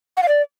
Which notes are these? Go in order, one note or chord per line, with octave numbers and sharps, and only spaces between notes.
F#5
F5
D5